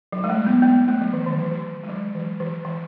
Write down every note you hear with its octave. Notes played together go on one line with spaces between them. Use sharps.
F#3
G#3
A3
B3
B3
A3
F#3
E3
D#3
E3
E3
G#3
F#3
E3
E3
E3